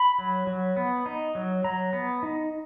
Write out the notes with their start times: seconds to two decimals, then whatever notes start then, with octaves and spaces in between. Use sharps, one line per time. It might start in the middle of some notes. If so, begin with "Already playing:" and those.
Already playing: B5
0.18 F#3
0.47 F#3
0.77 B3
1.06 D#4
1.35 F#3
1.64 F#3 A#5
1.93 B3
2.23 D#4